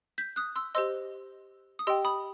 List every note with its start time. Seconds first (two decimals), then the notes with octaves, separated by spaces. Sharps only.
0.18 G6 B6
0.36 D#6 F#6
0.56 C6 E6
0.75 G4 C5 D#5 C6 E6
1.79 D#6
1.87 G4 D#5 G5 C6 E6
2.05 B5 D#6